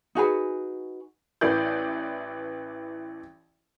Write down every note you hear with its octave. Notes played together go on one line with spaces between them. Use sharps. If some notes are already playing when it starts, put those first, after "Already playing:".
D#4 F#4 G#4 B4
A1 E3 D5 G6